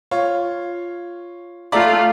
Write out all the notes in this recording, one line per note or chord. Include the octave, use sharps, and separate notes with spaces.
F4 C#5
A3 F4 D5 E5 A#5